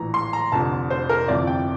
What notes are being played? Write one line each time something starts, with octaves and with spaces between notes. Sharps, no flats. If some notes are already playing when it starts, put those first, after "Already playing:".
Already playing: A#1 A2 E3 A#5
C6
A#5
F1 F2 D3 A5
C5
A#4
G1 F2 C3 E3 D5
G5